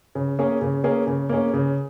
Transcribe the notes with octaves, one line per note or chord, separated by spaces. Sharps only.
C#3
A#3 C#4 G#4
C#3
A#3 C#4 G#4
C#3
A#3 C#4 G#4
C#3